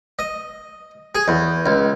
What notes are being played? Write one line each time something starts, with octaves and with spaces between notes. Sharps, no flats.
D#5
G#4
E2
C#2